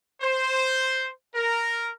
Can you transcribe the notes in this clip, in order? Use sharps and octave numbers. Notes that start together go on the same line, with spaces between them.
C5
A#4